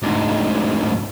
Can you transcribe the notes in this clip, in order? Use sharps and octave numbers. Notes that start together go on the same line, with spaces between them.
D2 G#2